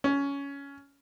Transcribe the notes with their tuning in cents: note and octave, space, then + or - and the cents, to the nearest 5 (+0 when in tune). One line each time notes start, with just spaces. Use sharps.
C#4 +15